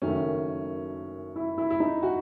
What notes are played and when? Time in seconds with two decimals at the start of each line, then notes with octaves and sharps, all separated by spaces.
0.02 F#1 F#2 D#3 F#3 A3 C#4
1.36 E4
1.58 E4
1.70 E4
1.80 D#4
2.03 F#4